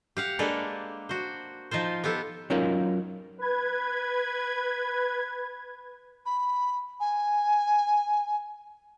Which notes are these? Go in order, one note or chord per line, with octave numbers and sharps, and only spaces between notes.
G4 F5 F#5
G#3 A#3 D4 A4 B4 D5
F#4 C5
F3 D#4 F4 C5
B3 F4 G4 A4
F#3 C#4 D#4 F4 A#4
B4 G#6
B5
G#5